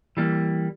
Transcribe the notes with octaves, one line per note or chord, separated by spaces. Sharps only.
E3 G3 A#3